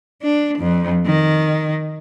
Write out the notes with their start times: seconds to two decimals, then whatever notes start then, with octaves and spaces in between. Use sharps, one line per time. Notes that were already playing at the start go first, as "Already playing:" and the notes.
0.22 D4
0.58 F2
1.06 D#3